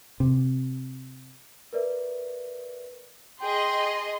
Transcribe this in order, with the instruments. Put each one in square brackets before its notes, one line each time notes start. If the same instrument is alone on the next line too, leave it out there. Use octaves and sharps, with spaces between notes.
[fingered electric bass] C3
[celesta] A#4 B4 D5 E5
[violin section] G#4 D#5 [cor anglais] G5 [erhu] C6